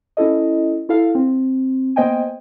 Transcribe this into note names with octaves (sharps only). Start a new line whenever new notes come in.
C#4 E4 A4 D#5
E4 A4 F5
C4
A#3 B3 C5 D#5 G5 G#5